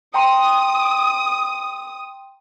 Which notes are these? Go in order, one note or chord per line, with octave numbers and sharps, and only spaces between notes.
G5 A#5 C6 D#6